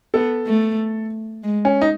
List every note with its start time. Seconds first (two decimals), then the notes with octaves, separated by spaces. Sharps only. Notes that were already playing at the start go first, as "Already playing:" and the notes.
0.14 B3 A4
0.46 A3
1.43 G#3
1.65 C#4
1.81 D#4